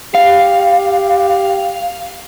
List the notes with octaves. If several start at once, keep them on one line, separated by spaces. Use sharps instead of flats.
G4 F5